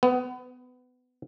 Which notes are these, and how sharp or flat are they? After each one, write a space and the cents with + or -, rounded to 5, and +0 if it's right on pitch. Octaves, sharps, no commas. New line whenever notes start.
B3 +25